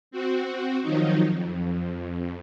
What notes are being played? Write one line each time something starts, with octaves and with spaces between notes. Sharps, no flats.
C4 F#4
D#3 F3 F#3 D#4
F2